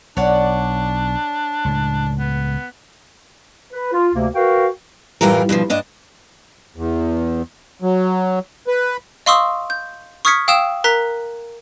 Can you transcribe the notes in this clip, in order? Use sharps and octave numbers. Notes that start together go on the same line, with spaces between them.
B1 D4 C#5 D5 F#5
C#2 A2
B3
B4
F4
D2 C3 A#3
F#4 A#4 B4 F5 G5
F#2 A2 E3 G3 F4 A#4
G2 B2 D#3 F3
G2 D4 D#5
E2
F#3
B4
D#5 F5 C6 C#6 D#6 E6
G6
C#6 D#6 F6 G#6 B6 C#7
F5 G5 D#6 E6 E7
A#4 A#5 F#6 B6